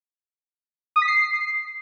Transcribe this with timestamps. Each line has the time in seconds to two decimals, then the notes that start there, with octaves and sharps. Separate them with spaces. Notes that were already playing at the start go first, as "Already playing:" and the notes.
0.96 D#6
1.02 B6
1.08 C7